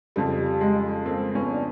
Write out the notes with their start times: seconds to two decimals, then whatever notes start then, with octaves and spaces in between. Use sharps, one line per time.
0.16 F2 C#3 F3 G3
0.61 G#3
1.06 A#3 C4
1.35 B3 C#4
1.54 D4